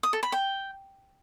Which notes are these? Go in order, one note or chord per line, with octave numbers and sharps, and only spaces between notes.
D#6
A4
B5
G5